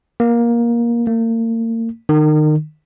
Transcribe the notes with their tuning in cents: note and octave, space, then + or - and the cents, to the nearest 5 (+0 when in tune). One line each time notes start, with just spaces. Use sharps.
A#3 +15
A#3 -40
D#3 -30